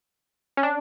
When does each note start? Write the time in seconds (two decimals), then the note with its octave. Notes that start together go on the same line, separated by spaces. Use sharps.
0.57 C#4
0.63 D4